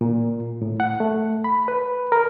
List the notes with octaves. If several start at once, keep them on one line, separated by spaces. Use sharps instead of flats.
A#2
A2
F#5
A3
B5
B4
A#4